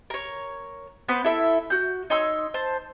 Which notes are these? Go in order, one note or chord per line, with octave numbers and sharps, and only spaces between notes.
A#4 C#5
B3 B4 C5
E4 A4 E5
F#4 G6
D#4 C#5 C6 E6
C5 A5